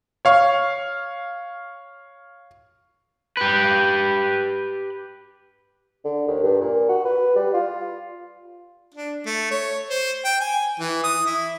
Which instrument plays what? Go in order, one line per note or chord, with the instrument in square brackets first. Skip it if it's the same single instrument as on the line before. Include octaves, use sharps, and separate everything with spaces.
[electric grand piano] C#5 F5 C#6
[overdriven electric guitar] G4 B4
[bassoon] D3
D#2
G2
A#2
F#4
B4
G3
F4
[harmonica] D4
A3
C#5
C5
G5
G#5
E3
D#6
E4